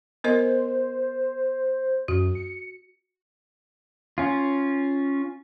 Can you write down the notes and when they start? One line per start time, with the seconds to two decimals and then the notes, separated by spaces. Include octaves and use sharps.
0.24 B3 A#4 C5 D#5
2.08 F#2 F#4
2.35 C#7
4.18 C#4 F4